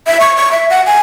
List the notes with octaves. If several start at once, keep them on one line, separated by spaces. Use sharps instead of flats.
E5
C#6
C#6
E5
F#5
G#5